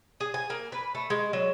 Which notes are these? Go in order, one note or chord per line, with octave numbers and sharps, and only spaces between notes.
G#4
G#5
A#3
B4
A3
G#3
F#3